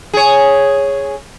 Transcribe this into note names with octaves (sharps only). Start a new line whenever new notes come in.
G#4 C#5